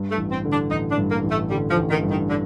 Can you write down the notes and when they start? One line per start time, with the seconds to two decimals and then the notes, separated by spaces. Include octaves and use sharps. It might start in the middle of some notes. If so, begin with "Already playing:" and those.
Already playing: G2
0.11 A3
0.17 A1
0.31 C4
0.45 D3
0.51 D4
0.71 A1 D#4
0.91 D4
0.98 G2
1.11 A#3
1.24 A1
1.30 A3
1.50 D3 G3
1.70 F3
1.77 A1
1.90 D#3
2.03 G2
2.10 D#3
2.30 D3